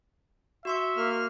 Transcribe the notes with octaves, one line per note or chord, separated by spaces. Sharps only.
F#4 E5 C6 C#6
A#3 F6